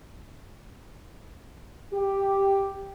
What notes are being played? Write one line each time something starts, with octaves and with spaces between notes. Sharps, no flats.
G4